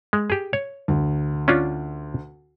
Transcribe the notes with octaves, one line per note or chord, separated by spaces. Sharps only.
G#3
G4 G#4
C#5
D2
C#4 D4 F4